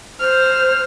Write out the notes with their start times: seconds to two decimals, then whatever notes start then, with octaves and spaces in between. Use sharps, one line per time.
0.20 C5 F6